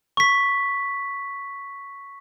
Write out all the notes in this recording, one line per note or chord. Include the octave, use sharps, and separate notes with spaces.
C#6 B6